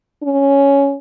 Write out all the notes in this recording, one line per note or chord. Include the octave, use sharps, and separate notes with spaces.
C#4